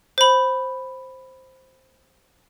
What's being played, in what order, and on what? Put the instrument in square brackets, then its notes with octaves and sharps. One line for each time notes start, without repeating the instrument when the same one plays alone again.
[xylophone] C5 B5